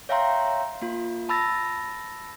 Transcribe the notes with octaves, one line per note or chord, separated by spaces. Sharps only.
C#5 E5 F5 G5 A#5 C6
A#3 F4
A5 B5 E6 A6 A#6